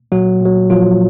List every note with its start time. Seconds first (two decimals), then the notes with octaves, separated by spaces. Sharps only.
0.12 A#2 F#3 F#4
0.41 A#2 F#3
0.69 A#2 F3 F#3 F4